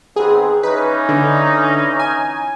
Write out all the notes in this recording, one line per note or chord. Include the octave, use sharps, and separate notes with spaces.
D#3 B3 C4 G#4
E3 C#4 D#4 B4
D3
G#5